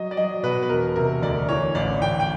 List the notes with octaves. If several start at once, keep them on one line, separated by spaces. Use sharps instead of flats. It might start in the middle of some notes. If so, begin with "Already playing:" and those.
Already playing: F#3 D#5
D5
F#3 D#5
B2 B4
B4
E1 A#4
C3 A#4
D2 D5
E3 C#5
A1 D5
A1 G5
G5